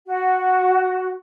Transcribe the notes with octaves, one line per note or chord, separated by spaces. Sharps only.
F#4